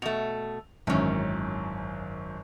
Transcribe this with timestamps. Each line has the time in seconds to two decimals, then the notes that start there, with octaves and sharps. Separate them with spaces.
0.02 B2 A3 F7
0.87 G#1 F#2 D#3 E3 C#4